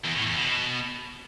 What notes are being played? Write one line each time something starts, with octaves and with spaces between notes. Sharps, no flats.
E2
A2
E2
B2